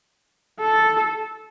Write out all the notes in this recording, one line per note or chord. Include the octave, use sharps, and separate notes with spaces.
A4